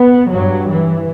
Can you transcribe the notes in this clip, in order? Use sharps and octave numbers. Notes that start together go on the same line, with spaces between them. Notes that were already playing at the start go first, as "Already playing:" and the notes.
Already playing: B3
G2 F#3
E3